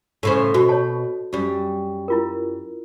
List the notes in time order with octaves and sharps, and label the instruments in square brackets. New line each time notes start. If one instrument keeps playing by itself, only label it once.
[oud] A2 C#3 C5
[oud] B2 [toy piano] F#4
[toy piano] C#5 A5
[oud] F#2 G3
[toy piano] E4 F4 A#4